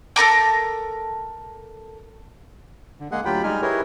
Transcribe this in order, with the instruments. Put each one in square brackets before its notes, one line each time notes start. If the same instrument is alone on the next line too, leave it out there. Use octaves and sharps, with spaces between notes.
[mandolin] A4 A#4 A#5 D6
[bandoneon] D3
G#3 A#3 G#4 F#5
D2 F#3 F4 G4 G5 B5
G3 G#3 D#4 G#5 F6
E4 G4 G#4 A#4 B4 C#5